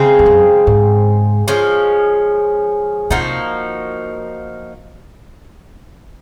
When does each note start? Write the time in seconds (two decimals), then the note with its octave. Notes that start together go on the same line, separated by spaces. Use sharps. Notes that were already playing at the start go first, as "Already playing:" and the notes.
Already playing: C#3 G#3 C4
0.19 F2
0.26 F#2
0.67 G#2
1.48 F3 G#3 C#4
3.10 C3 F3 A#3 D#4 F#4